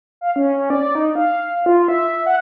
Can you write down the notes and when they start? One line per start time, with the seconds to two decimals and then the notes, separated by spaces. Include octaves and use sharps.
0.21 F5
0.36 C#4
0.70 D5
0.95 D#4
1.15 F5
1.66 F4
1.88 E5
2.26 F#5